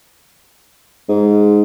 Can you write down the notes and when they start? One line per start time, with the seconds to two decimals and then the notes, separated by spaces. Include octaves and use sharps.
1.09 G#2